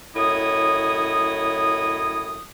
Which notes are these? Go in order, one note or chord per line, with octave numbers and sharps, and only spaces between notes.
F#2 A2 E4 C#5 D#5 D#6